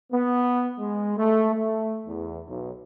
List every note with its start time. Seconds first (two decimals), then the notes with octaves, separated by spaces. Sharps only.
0.12 B3
0.79 G#3
1.17 A3
1.55 A3
2.07 E2
2.48 B1